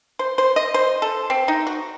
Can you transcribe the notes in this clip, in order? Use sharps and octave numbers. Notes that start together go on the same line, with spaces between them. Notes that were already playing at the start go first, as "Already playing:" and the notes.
C5
C5
D#5
C5
A4
C4
D#4
F#4